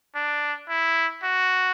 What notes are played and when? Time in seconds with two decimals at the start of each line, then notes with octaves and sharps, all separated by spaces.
0.15 D4
0.69 E4
1.24 F#4